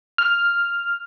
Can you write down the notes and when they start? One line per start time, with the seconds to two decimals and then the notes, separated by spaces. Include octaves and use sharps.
0.18 F6